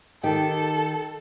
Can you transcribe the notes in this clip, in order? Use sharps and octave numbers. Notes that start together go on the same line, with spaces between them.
D#3 D#4 G4 A4